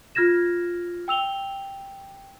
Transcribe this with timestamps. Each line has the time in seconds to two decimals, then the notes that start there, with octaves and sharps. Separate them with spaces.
0.15 F4 F6 G#6 A#6 E7
1.08 G5 E6 F7 G7